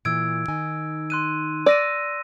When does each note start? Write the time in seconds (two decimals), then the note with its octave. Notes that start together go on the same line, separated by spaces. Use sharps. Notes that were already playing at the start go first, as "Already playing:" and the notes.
0.05 A#2 E3 F4 E6 G#6 D7
0.48 D#3 D#4 G#5
1.10 C6 F#6 D#7
1.66 D5 E6 A#6 D#7